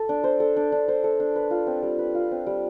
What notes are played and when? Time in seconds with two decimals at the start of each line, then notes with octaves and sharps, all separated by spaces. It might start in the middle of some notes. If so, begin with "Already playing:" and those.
Already playing: A4
0.09 D4
0.24 C5
0.40 A4
0.56 D4
0.72 D4
0.88 C5
1.04 A4
1.20 D4
1.36 B4
1.51 F4
1.67 C4
1.83 G3
1.99 B4
2.15 F4
2.31 C4
2.47 G3